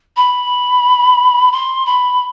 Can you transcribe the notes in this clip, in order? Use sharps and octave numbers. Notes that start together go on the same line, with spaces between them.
B5
C6
B5